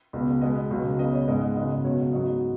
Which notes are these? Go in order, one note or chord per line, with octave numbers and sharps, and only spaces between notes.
C#2 B2 B3
B2 G#3 B3 D#5
C#2 B2 F#3
C#2 C#3 B3 D#5
C#5
G#2 G#3 B3 D#5
F#5
F#2 C#3 B3 D#5
C#2 B2 F#3 B3 C#5
G#2 F#3 B3 D#5